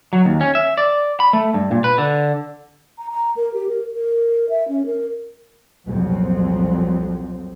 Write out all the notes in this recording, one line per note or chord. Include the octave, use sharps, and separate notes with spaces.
F#3
D#2
C#4
E5
D5
B5
A3
G2
A#2
B4
D3
A#5
A#5
A#4
G4
A#4
A#4
E5
C#4
A#4
C2 F2 A#2 F#3 C4